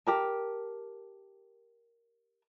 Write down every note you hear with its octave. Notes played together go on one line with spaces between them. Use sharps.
G4 A#4 A5